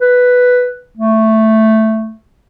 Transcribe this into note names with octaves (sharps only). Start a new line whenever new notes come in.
B4
A3